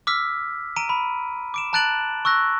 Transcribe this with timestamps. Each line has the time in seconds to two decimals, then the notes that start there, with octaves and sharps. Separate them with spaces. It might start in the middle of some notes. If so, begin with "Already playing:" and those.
0.07 D6 E6 F6 B6
0.76 A#5 D7 D#7
0.89 B5
1.54 D6 D7 E7
1.73 A5 A#5 F#6 A6 D7 F#7
2.25 C#6 E6 F#6 A#6